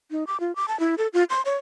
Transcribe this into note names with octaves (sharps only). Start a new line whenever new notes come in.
D#4
D6
F4
D6
A5
E4
A4
F4
C6
C#5